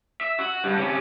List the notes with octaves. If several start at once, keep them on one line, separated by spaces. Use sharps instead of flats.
E5
F#4
G2
C3 C#4